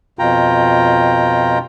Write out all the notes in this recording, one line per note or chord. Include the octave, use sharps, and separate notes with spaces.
F2 B2 F4 G5 A#5